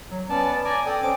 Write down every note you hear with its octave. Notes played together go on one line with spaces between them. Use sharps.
F#3
B3 C#4 D5 A5
D5 G#5 A#5 D6
A4 D5 G5 D#6
C4 C#4 D6